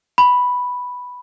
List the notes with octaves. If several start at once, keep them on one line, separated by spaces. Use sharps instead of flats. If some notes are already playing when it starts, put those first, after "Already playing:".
B5